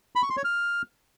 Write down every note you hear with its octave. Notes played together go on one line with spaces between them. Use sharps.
B5
C#6
C6
C#5
F6